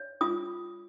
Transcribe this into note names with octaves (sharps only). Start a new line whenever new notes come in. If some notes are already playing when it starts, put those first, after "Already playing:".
Already playing: C#5
F4 D#6